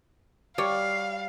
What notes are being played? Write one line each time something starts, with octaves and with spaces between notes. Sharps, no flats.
G3 C#5 D5 F5